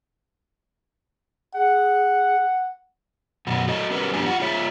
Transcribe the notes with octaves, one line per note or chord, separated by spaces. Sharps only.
G#4 F#5
F#2 B2 F#4
A3 F#4 D#5
G3 C#4 F#4 A#4 B4
G2 F3 B3 D4 G4 G#5
F4 F#5
D#4 F4 G#4 C#5 E5